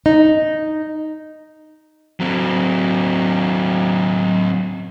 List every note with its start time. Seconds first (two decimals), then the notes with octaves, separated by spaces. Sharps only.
0.06 D#4
2.20 F#3 C4